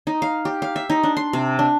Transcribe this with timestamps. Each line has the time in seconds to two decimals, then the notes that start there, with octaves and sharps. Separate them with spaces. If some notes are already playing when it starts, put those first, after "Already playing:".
0.07 D#4
0.22 F5
0.45 G4
0.62 F5
0.76 E5
0.90 D#4
1.03 D4
1.17 C6
1.33 C3
1.59 D4